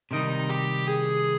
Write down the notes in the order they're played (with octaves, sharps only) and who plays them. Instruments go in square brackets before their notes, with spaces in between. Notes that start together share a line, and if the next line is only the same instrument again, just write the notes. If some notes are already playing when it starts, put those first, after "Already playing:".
[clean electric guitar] C3 D#3 G3 [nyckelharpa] D#4
[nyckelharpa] G4
G#4